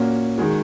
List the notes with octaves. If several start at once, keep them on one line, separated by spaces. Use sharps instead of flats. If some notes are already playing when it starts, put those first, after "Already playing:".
Already playing: A#2 A#3 C#4 F#4
D#3 G#3 F#4